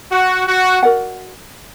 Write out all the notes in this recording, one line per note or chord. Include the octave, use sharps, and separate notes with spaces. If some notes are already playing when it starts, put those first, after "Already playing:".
F#4
F#4
F#4 A#4 D5 F#5